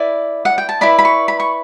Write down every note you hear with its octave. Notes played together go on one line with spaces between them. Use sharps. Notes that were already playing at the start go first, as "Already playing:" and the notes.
Already playing: E4 B4 D5
F#5
G5
A5
E4 B4 D5 B5
B5
C#6
B5
C#6